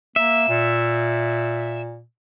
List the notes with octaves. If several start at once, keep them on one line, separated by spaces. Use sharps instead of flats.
A#3 E5
A#2